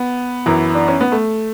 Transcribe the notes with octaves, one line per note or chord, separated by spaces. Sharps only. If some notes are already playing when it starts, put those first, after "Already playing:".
Already playing: B3
F#2 E3
D4
C#4
B3
A3